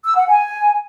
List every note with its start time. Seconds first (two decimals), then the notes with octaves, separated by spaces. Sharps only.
0.04 E6
0.16 F#5
0.28 G#5